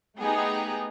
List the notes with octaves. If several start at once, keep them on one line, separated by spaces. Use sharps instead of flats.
A3 B3 D#4 G4 G#4